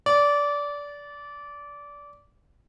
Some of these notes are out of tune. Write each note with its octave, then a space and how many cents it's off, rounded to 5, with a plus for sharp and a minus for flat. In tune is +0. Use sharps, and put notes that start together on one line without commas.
D5 -20